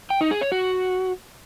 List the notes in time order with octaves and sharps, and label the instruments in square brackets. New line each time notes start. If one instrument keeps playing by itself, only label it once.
[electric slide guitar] G5
D#4
G#4
C#5
F#4